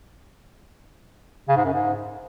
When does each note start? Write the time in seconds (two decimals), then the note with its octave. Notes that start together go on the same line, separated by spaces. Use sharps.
1.49 C#3
1.57 G#2
1.65 F#2
1.73 G#2